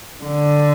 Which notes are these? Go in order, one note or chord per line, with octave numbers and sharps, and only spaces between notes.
D3